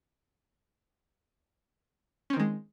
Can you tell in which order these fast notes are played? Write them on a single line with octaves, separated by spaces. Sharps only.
C#4 C4 D#3 G#3